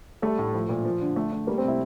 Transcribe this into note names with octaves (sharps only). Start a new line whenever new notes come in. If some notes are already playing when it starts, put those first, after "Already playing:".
G3 A3 A4
A2
F3
A#2
F3
D3
A3
A3
G3 A#3 A#4
C4 C5
C3
E4 E5